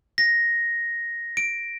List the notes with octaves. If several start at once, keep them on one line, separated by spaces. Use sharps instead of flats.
A#6
D7